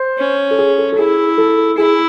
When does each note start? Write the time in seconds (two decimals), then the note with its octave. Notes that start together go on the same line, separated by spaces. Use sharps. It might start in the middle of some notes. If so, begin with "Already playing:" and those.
Already playing: C5
0.18 C#4
0.51 A4
0.59 G#4
0.78 A4
0.92 A4
0.99 E4 G#4
1.38 A4
1.78 E4 G#4